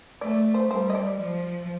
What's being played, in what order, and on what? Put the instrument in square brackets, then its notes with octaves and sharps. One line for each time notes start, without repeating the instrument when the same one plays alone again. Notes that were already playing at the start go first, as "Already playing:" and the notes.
[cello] A3 [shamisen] D5
[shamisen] C5
[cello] G3 [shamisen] C5
[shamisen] D#5
D5
[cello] F3